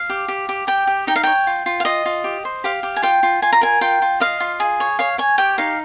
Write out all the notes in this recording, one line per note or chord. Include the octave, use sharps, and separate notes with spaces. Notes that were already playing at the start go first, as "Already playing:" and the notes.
Already playing: F5
G4
G4
G4
G4 G5
G4
D#4 G5
F5
C#5 G5
F4
F4
F5
F4 D#5
F4
G4
C5
G4 F5
G4
G#5
F4 G5
F4
F4 G#5
A#5
A#4 G#5
F4 G5
F4
D#5 F5
F4
G#4
C#5
C#5 F5
C#5 G#5
G4 G5
D#4 F5